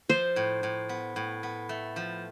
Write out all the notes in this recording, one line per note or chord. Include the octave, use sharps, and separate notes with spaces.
F3 C5
A2
A2
B3
A2
B3
A3
F3